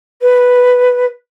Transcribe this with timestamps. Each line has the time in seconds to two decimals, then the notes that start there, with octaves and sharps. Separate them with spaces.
0.22 B4